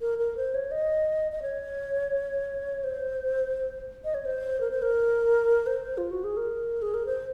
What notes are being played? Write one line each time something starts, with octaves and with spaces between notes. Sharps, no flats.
A#4
A#4
C5
C#5
D#5
D#5
C#5
C5
D#5
C#5
C5
A#4
C5
A#4
C5
F4
F#4
G#4
A#4
G#4
A#4
C5